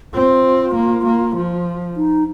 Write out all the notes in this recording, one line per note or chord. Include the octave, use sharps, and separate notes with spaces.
C4 F4
A#3
A#3
F3
D#4